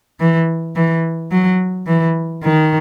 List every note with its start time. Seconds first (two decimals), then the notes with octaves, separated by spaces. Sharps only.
0.20 E3
0.76 E3
1.32 F#3
1.87 E3
2.43 D#3